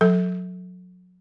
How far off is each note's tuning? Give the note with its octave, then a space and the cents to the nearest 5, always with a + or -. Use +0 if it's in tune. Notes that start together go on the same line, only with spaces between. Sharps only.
F#3 -25 A4 +0